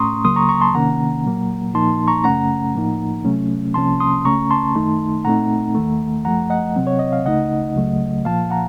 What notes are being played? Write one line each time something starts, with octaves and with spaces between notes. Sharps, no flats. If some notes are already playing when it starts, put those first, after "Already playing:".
Already playing: A2 A3 C#4 A#5 C6 C#6 D#6
C#2 C#3 F#3 A#3 C6 D#6
A#5 C#6
A#5 C#6
A5 C6
C3 D#3 A#3 C#4 F#5 A#5
A#2 F#3 A#3
A#2 F3 A#3 D#4 A5 C6
A#5 C#6
F#2 C#3 A3 C#4 F#5 A#5
A2 F3 A#3 D#4
C3 F#3 A3 C#4
C2 C3 F3 A#3 C#4 A5 C6
C6 D#6
C#2 C#3 A3 C#4 A#5 C#6
A5 C6
F#2 D#3 A3 D#4
A#2 A3 C4 D#4 F#5 A#5
D#2 D#3 A3
F#2 F3 A3 F#5 A#5
D#5 F#5
C3 F#3 C4
C#5
D#5
F5
C#2 C#3 A3 D#4 D#5 F#5
C#2 C#3 F#3 A3
A#2 F3 A#3 F5 A5
F#5 A#5